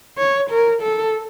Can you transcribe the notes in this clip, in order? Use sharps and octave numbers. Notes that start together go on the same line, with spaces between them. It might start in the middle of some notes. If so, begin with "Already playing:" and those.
C#5
A#4
A4